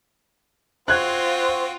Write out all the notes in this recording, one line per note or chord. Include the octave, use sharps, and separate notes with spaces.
C4 F4 F#4 C5 F#6 G#6